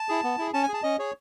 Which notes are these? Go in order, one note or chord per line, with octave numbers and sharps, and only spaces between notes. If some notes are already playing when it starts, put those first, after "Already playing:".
Already playing: A5
E4 G#4
B3
E4 G#4
C#4 A5
G#5
G#4
A5
C#4 D#5
G#4 C#5